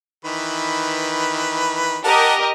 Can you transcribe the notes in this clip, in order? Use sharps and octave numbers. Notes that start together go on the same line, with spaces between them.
D#3 E3 B4
G4 A#4 D#5 F#5 A5